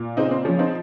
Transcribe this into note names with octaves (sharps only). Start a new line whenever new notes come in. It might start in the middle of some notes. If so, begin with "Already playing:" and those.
Already playing: A#2
C#3 C4 D#4
C4
F3 C#4
C4 D#4